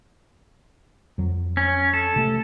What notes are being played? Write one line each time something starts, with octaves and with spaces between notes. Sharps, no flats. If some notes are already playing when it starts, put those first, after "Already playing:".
F2 F#3
C#4
A4
C3 A3